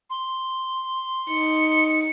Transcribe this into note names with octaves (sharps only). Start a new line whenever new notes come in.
C6
D#4 C#7